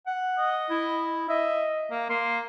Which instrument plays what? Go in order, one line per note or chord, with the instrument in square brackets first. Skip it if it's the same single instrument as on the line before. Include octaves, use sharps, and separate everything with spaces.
[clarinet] F#5
[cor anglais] D#5
[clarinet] E4
[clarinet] D#5 [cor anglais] E5
[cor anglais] A#3
[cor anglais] A#3 [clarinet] C6